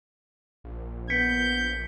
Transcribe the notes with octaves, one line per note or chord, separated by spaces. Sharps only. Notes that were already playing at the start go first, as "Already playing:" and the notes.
A#1
B3 G6 B6 C#7